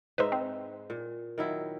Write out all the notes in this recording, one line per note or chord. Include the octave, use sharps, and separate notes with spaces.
G#2 D#4 B4 C5 E5
C4
A#2
D#3 F#3 E4